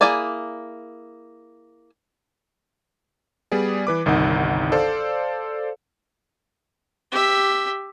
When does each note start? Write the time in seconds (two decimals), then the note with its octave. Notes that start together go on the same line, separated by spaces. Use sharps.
0.01 A#3 E4 G#4 D5 G#5
3.52 G3 B3 G#4 D5
3.87 E3 B4 D6
4.06 G1 C2 D#3 D#4 F#5
4.72 A4 C5 D5 F5
7.12 G4 E5